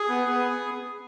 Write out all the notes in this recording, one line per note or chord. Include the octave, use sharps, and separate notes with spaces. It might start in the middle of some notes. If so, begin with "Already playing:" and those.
Already playing: G#4
B3
B3